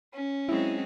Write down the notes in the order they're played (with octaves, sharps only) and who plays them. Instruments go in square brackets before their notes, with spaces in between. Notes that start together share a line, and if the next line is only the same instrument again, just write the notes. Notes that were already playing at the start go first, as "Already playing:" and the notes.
[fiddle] C#4
[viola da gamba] F#3 G#3 C4 [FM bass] E4